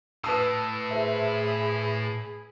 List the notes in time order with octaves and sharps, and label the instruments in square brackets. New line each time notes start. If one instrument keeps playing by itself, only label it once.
[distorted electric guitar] A2 [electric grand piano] B4 A5 E6 [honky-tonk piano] D#6
[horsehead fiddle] G#4 B5 [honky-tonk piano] C5 E5